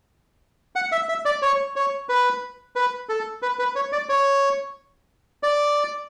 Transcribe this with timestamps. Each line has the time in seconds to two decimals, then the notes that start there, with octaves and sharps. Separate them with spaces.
0.76 F#5
0.92 E5
1.09 E5
1.25 D5
1.42 C#5
1.76 C#5
2.09 B4
2.76 B4
3.09 A4
3.42 B4
3.59 B4
3.76 C#5
3.92 D5
4.09 C#5
5.43 D5